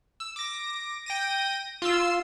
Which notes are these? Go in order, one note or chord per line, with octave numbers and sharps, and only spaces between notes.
E6
D6 A#6
G5 A#6 D#7
F4 C6 E6